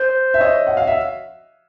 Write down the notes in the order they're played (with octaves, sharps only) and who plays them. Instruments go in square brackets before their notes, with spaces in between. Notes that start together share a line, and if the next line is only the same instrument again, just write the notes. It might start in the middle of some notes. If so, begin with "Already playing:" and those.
Already playing: [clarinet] C5
[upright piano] E5
C#5 D#5
F#5
F5
E5